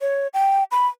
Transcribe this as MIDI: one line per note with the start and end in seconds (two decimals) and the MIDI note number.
0.01 0.27 73
0.34 0.64 79
0.71 0.87 83